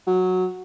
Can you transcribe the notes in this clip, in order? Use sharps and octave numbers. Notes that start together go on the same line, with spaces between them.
F#3